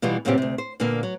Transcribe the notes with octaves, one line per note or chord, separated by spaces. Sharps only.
B2 E3 G3 B3 F4
F#2 A#2 C#3 B3 C4 G4
D2 C3
C5
A#2 D3 A#3 B3
F#3